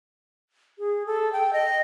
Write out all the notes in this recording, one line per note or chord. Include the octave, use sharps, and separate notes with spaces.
G#4
A4
G5
D#5